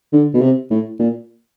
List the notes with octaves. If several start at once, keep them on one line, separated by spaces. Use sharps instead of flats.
D3
B2
C3
A2
A#2